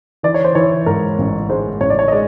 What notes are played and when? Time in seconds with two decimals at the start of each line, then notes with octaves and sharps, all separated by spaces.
0.23 E3 D5
0.34 C#5
0.44 C5
0.55 E3 C#5
0.86 G#2 A#4
1.18 A1
1.49 G#3 C5
1.80 A1 C#5
1.90 D5
1.99 C#5
2.08 D#5
2.12 G#3 D5